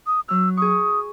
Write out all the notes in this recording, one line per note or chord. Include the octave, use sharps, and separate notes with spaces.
D#6
F#3 E6 F6
G#4 C#6 D#6